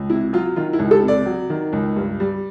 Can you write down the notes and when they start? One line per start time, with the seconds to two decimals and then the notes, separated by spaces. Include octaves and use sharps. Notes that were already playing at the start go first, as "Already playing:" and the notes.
Already playing: C#2
0.10 C3 E4
0.33 F#3 F4
0.56 D#3 F4
0.73 E4
0.79 C#2
0.91 A4
1.03 C3
1.08 D5
1.26 F#3
1.50 D#3
1.73 C#2
1.96 G2
2.20 G3